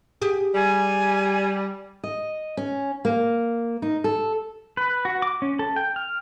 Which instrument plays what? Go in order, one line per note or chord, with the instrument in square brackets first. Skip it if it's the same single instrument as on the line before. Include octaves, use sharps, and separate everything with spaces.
[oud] G4 G#4
[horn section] G3 [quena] G#5
[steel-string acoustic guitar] D#5
C#4
A#3
D#4
A4
[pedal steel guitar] B4
F#4
D6
C#4
A4
G5
F6